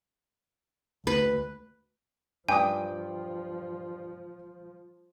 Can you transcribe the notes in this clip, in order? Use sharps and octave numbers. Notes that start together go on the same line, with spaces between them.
D2 B4
G2 F3 G5 G#5 D6 D#6